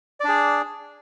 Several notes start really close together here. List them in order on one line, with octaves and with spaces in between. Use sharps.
D5 D4 G#4